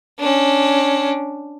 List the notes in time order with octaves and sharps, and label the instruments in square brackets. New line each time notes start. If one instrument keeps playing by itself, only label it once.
[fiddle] C#4 D4